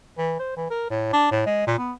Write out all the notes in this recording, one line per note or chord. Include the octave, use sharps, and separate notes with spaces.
E3
C5
E3
A#4
A2
D4
A2
G#3
A#2
B3